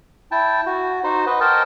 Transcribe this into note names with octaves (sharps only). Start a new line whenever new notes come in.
E4 G5 A5
F#4
D#4 F#4 C5
B4 D#5
A#4 C5 D#5 G5 A5